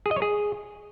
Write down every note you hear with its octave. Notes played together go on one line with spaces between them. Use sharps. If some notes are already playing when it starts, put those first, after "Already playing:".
G#4
D#5
C#5
G#4